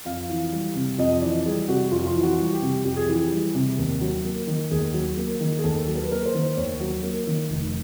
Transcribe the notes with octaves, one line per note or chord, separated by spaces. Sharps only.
F2 F5
E3
G3
C3
F2 D#5
E3 D5
G3 G#4
G4
C3 F#4
F2 F4
F4
E3
F#4
G3
G4
C3
F2 G4
G#4
E3 G4
G3
C3
D#2
F#3
A#3
D#3
D#2 G#4
F#3
A#3
D#3
G#4
D#2 A4
F#3
A#4
B4
A#3 A#4
C5
D#3
D#2 C#5
F#3
A#3
D#3
F1